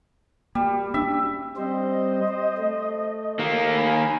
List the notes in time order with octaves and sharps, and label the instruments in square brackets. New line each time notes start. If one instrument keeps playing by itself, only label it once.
[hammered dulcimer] G3 [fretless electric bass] A#3
[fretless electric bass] C#4 D4 [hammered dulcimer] E5
[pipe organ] G3 C4 C5 [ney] D#5
[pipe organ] C5
A3
[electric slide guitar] D#3 A#3
[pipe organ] G#5 B5